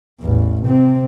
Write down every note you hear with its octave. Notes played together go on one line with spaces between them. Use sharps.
A1 E2
C3 C4